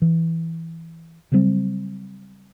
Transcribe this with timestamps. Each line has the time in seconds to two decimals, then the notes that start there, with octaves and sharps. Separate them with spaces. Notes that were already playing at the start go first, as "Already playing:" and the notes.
0.02 E3
1.32 C#3 F#3 G3 C4